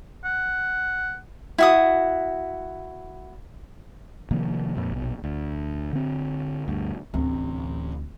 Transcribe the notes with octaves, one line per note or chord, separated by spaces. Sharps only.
F#5
E4 F#4 D#6
C3 D#3 F3 A#3
F2 A#2
A#1 B2
D2
D3 C4
D2 G2
A1 D2 C3